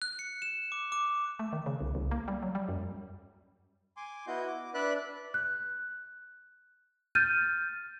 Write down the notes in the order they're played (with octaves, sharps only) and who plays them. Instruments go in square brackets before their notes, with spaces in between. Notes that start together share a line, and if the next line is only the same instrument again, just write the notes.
[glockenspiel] F#6
C#7
E7
D6
D6
[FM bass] A3
D#3
C#3
C2
C2
A#3
G3
F#3
G3
F#2
[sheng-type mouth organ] G#5 C6 D6
B3 E4 F#4 D#5 G6
D6
D4 B4 D5 E5 B5 F#6
[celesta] F#6
F6 G6 A6 D#7